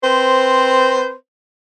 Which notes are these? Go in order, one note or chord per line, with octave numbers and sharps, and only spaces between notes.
C4 B4 C5